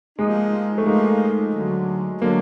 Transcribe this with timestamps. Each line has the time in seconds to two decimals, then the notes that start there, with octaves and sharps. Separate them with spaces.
0.18 F3 G#3 A#3 D#4
0.78 A3
0.86 F3 G#3 A#3 D#4
1.54 D2 D3 F#3
2.21 D3 F#3 A#3